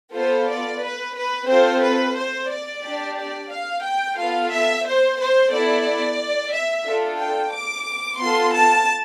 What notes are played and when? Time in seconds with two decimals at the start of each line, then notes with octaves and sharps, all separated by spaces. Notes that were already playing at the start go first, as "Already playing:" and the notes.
0.14 B3 F4 A4 C5
0.47 D5
0.81 B4
1.14 B4
1.48 C4 F4 A4 C5
1.82 B4
2.15 C5
2.49 D5
2.82 D4 G4
3.16 D5
3.49 F5
3.83 G5
4.16 B3 F4 A4 F5
4.50 E5
4.84 C5
5.18 C5
5.51 B3 E4 A4 D5
6.51 E5
6.85 D4 F4 A4
7.18 G5
7.52 D6
8.19 B3 F4 A4 C6
8.53 A5